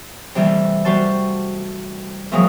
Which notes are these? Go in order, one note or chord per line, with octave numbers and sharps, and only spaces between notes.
C3 E3 G3 A3
G3 A3 F#4 C5 A5
F2 A#2 E3 F#3 G#3